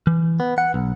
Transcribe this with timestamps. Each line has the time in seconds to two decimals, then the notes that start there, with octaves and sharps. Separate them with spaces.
0.07 E3
0.40 B3
0.58 F#5
0.74 B1